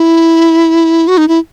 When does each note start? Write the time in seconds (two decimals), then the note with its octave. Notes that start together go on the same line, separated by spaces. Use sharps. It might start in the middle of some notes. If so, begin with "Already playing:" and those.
Already playing: E4
1.08 F#4
1.18 D#4
1.28 E4